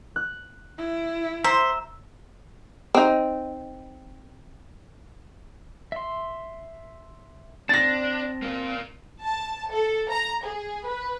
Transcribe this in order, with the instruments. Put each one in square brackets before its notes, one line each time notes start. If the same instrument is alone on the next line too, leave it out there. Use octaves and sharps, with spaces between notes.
[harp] F#6
[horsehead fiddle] E4
[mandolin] C5 [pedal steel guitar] E5 [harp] A#5
[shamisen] C4 D#4
[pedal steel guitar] E5 C6
[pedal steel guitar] C4 A5 [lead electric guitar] D4 [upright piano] A6 A#6
[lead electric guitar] A#3 F4
[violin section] A5
A4
A#5
G#4
B4